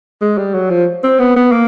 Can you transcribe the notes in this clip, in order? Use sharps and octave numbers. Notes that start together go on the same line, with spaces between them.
G#3
G3
F#3
F3
C4
B3
B3
A#3